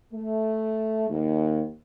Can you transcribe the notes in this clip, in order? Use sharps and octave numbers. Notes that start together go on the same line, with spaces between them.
A3
D#2